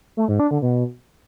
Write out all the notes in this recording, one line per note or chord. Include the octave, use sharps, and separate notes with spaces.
A3
G#2
D4
D3
B2